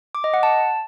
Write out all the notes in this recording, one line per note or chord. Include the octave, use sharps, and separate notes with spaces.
D6
D#5
F#5
A5